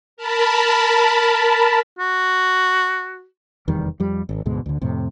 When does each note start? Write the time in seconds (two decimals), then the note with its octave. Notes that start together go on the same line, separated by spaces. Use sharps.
0.17 A#4 A5 B5
1.99 F#4
3.68 F1 E2 D#3 G3
4.00 F2 G3
4.29 G#1
4.46 D2 G#2 B2 G#3
4.66 D2 D3
4.82 F2 A2 C3